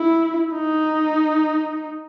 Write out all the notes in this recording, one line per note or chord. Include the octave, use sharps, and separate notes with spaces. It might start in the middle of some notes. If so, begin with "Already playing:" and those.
Already playing: E4
D#4